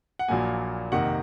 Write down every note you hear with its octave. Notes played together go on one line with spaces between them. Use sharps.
F#5
A#1 A#2 F#3 A#3 G#5
F2 C3 D#3 A#3 F#5